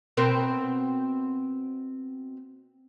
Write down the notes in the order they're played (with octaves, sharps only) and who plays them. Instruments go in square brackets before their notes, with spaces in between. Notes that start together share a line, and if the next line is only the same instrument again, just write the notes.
[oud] B2 C4 A#4